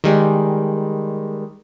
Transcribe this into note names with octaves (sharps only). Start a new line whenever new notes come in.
D#3 G3 G#3